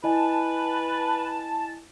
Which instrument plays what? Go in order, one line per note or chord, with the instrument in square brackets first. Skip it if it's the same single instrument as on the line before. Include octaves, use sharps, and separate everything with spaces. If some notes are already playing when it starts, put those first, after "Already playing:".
[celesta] E4 D#5 G#5 [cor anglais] B4 [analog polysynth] A5